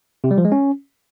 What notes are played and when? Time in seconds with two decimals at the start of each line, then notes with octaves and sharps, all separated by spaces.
0.24 C3
0.31 G3
0.38 F3
0.45 G#3
0.52 C#4